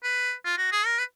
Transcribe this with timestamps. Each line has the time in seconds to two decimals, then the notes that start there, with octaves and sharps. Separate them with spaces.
0.04 B4
0.45 F4
0.58 F#4
0.72 G#4
0.86 A#4
0.99 B4